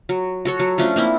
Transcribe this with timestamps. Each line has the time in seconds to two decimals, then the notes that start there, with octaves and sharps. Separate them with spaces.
0.09 F#3
0.45 F#4 A4 C#5
0.60 F#3
0.78 F3 A3 C#4 D4
0.96 A#3 C4 E4